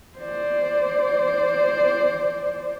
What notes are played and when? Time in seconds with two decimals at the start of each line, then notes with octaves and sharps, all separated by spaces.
0.18 C5 D5